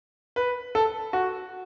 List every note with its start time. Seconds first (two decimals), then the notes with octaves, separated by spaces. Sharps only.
0.36 B4
0.75 A4
1.13 F#4